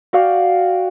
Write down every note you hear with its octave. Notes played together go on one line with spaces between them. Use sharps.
F#4 D5 F5 G5